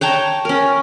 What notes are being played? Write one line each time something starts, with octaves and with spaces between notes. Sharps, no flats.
C#5 G5 A5 A#5
C#4 A#4